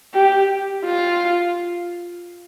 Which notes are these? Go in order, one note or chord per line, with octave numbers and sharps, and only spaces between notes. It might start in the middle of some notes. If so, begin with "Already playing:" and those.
G4
F4